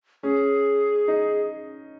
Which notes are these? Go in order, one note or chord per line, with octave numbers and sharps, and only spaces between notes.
C#4 G#4
D#4